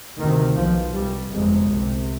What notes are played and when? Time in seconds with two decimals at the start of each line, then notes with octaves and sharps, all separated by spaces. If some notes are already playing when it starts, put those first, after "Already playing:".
0.19 D2 C3 D#3
0.56 B1 B2 F3
0.93 C2 B2 G3
1.29 G1 F2 C3 G#3
1.67 C2 C3